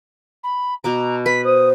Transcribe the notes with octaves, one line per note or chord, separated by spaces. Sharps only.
B5
B2 B3 A#5 D6
B4 B6
C5 D#6